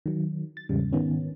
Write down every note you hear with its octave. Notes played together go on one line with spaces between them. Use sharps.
D#3 F#3
A6
E2 G#2 C#3 G3
G#2 D#3 B3 C#4